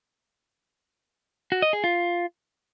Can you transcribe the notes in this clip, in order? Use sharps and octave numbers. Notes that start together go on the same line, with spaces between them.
F#4
D#5
G#4
F4